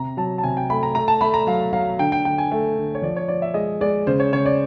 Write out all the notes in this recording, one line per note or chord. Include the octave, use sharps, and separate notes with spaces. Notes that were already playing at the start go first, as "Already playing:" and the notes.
Already playing: C3 A#5
F#3 A5
A5
C3 G#5
G5
A3 B5
A#5
A3 A#5
A5
A3 B5
A#5
F#3 F5
F#3 F5
D3 G5
G5
D3 G5
G#5
A3
D3
C#5
F3 D5
C#5
F3 D5
E5
G#3 D#5
G#3 D5
C#3 C5
C#5
C#3 C#5
D5